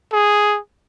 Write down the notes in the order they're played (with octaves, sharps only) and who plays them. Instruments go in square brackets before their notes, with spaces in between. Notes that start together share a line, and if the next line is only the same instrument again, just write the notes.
[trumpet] G#4